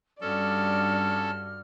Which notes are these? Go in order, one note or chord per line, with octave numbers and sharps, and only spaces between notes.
G2 C#4 F#4 A4 D5 F6